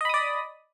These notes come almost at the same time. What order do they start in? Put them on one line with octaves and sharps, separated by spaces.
D#5 B5 D#6 D5